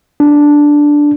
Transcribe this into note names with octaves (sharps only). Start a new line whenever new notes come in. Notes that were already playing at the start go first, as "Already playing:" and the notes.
D4